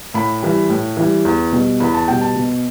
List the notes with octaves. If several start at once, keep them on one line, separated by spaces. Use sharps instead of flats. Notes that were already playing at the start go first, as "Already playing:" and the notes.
A2 B5
E3 G3
A2
E3 G3
E2
B2 G3
E2 B5
A5
B2 G3 G5
A5
B2